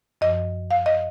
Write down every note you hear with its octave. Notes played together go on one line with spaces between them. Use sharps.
F#2 F3 D#5
F5
D#5